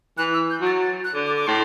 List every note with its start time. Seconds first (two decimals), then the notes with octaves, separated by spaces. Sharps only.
0.18 E3 F#6
0.34 E6
0.50 G6
0.61 F#3
0.66 A6
0.82 A6
1.04 F#6
1.15 D3
1.26 D6
1.36 D6
1.47 A2 C6